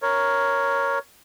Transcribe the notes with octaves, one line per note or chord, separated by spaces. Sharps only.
A#4 C#5